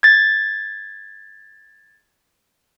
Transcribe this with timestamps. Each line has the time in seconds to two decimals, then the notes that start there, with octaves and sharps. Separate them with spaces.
0.03 G#6 A6